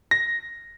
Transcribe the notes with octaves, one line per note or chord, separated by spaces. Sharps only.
A#6